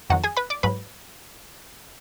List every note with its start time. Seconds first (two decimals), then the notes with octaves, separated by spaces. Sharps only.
0.10 F2 D#3 F#3 F#4 F#5
0.24 G#4 G#5
0.37 B4 B5
0.50 D5 D6
0.63 G#2 F#3 B4 B5